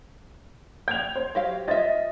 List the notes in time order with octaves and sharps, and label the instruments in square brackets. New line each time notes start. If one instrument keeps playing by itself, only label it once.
[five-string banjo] G5 [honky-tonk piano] G6 G#6 F7
[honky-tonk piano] C5
[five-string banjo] F#3 G4 F5
[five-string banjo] F4 E5 [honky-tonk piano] D#5 A6